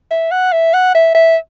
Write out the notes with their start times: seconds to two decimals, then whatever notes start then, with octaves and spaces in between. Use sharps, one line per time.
0.11 E5
0.31 F#5
0.52 E5
0.74 F#5
0.94 E5
1.15 E5